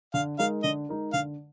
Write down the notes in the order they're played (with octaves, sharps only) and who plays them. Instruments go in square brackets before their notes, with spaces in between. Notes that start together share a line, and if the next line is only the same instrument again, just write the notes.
[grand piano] D3 [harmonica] F5
[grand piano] G#3 D#4 A#4 [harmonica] F5
[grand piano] D3 [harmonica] D#5
[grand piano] G#3 D#4 A#4
[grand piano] D3 [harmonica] F5